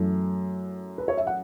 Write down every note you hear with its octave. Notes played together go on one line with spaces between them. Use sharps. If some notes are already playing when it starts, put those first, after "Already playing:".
Already playing: F#2 E3 A3
B4
C#5
E5
F#5